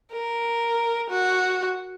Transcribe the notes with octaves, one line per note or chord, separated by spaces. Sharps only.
A#4
F#4